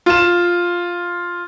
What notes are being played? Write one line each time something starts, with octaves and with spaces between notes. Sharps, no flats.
F4 E7